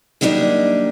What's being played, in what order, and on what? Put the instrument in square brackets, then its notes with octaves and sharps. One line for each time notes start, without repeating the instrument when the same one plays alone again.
[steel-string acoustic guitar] D#3 F#3 G3 A#3 D4 D#4